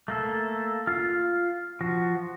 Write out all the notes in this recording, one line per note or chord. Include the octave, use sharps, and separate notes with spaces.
A3 A#3 A4
F4 F5
F3 F#4